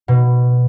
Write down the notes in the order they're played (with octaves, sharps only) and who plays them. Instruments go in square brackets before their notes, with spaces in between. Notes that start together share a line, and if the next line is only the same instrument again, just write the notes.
[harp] B2